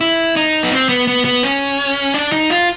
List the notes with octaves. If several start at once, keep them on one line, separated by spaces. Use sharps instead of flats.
E4
D#4
B3
C4
B3
B3
B3
C#4
D4
D#4
F4